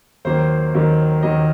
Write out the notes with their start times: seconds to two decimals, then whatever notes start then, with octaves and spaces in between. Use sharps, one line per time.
0.25 D#2 D#3 F#3 A#3 C5
0.74 D#2 D#3 F#3 A#3
1.23 D#2 D#3 F#3 A#3 D#5